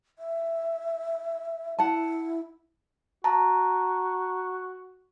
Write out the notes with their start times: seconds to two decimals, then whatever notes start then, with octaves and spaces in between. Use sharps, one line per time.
0.18 E5
1.79 E4 F#5 A5
3.24 F#4 A5 A#5